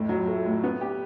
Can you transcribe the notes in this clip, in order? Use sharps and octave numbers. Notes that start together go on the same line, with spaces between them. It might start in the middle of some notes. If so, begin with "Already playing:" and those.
Already playing: F2 A2
F#3
A3
A2
B3
G4